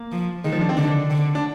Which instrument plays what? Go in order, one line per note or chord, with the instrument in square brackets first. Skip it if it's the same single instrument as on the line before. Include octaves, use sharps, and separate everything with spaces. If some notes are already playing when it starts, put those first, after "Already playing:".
Already playing: [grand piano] A#3
[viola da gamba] F3
[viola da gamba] D#3 [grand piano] G#3
[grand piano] F3
D4
C4
[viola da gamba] D3 [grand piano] D4
[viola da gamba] D3
[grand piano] D4